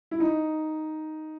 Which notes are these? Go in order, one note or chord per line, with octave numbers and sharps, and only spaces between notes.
E4
D#4